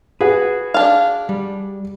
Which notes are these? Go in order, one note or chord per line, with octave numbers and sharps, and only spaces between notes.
F#4 G#4 B4
D4 F5
G3